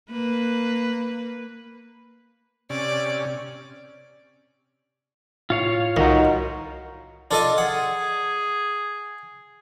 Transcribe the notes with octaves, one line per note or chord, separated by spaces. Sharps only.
A#3 B4
C3 C#4 D5
A2 F4 C#5 F5
C2 D#3 D#4 F#4 D#5
D4 F4 A4 D#5
G#4 F#5